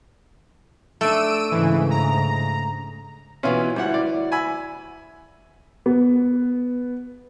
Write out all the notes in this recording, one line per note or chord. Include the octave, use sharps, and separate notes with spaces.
A3 D4 E6 D7 D#7
G#2 C#3 E3
A#5
B2 E3 B3 C#4 E4 F4
D2 G3 E4 F#5
D5
G#5 B5 E6
B3